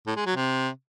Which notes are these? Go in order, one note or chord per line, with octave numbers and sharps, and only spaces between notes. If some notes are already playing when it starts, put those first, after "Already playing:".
A2
G#3
F#3
C3